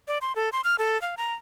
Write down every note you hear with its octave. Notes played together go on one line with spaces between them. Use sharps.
D5
C6
A4
C6
F6
A4
F5
A#5